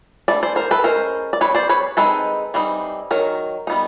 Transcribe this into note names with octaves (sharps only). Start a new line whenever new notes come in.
E3 A3 D4 D5
C5 D5
A#4 C5
A4 B4
G#3 C#4 A#4 C5
D5
G3 C4 D#4 B4 C#5
C5 D5
B4 C#5
G#3 C4 D#4 A4 B4
E3 G3 C4 D#4
D#3 F#3 A#4
G3 B3 D#4